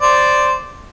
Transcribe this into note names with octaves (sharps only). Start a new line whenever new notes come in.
C5 D5